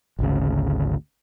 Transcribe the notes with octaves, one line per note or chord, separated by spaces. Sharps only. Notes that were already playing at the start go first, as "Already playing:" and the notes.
G#1 D2 C#3